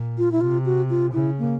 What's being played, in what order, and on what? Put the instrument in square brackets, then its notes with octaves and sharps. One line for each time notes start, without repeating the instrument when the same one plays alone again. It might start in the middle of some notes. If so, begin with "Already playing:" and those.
Already playing: [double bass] A#2
[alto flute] F4
E4
[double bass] C3 [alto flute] F4
[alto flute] F#4
F4
[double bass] C#3 [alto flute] E4
[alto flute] A#3